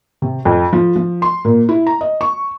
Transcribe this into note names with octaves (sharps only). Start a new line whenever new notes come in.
C3
F2
F3
F3
C6
A#2
E4
A#5
D#5
C#6